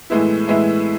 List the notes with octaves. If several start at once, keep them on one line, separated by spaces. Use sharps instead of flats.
A2 E3 G#3 B3 E4
A2 E3 G#3 B3 E4